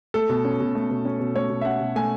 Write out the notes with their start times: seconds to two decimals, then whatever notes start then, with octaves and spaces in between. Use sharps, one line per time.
0.14 A3 A4
0.29 B2
0.45 C#4
0.60 B2
0.75 A3
0.91 B2
1.05 C#4
1.20 B2
1.35 A3 C#5
1.50 B2
1.61 E5
1.65 C#4 F#5
1.80 B2
1.96 A3 G#5